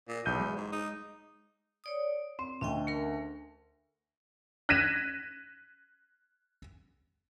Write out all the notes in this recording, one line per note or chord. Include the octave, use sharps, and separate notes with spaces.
A#2
B1 E2 G6 D#7
G#3
G#2
D#4
C#5 D5 D#6
C4 C6
D2 D3 C#4 D#5 G5
A3 A#4
F#6 G#6 A#6 B6 D#7 E7